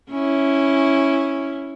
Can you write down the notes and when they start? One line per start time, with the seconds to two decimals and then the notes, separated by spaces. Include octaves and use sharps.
0.11 C#4 E4